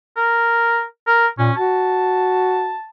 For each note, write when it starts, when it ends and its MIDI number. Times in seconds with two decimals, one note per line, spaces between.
0.16 0.82 70
1.07 1.27 70
1.39 1.50 46
1.39 1.53 61
1.56 2.74 66
1.56 2.88 81